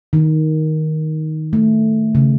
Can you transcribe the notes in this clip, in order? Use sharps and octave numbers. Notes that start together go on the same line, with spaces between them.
D#3
A3
C#3